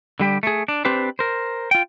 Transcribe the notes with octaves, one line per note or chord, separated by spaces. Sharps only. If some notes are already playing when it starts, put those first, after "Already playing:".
D3 G3 G4
A3 G#4
D4
C4 D4 G4 B4 C5
A#4 C5
F4 G5